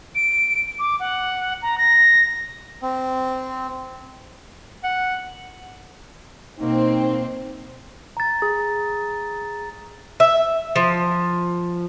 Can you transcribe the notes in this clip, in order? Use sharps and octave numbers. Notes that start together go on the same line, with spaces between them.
D7
D6
F#5
A#5
A#6
C4
F#5
B2 A#3 C4 D#4
A#5 A6
G#4
E5
F3